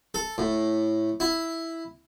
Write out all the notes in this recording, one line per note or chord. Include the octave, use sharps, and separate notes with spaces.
A4
A2
E4